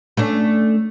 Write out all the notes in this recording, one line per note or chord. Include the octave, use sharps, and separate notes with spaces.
A3 C#4 D4